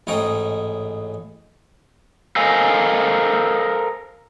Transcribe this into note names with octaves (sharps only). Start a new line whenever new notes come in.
A1 G#2 C#5 D#5 G5 A#5
A4 A#4 C5 D#5 F5 G#5